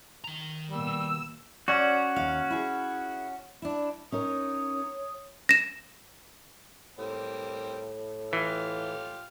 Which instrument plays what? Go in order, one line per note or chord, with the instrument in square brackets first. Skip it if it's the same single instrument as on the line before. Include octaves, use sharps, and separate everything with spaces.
[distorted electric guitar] D#3 A#5
[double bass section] B2 A#3 [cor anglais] G3 [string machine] E6
[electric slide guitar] C#4 F#4 [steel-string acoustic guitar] D5
[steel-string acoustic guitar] D#2 F5
E4 G#4
D4 E4
[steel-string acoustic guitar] C#4 D#4 A#4 [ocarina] C#5 [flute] D#6
[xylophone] A#6 E7
[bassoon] A2 [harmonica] G3 A#3 C4
[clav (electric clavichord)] E3 [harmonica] F4 G4 F6